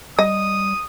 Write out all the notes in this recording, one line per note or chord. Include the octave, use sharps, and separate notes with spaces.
G3 D#5 D#6